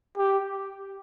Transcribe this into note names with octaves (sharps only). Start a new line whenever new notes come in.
G4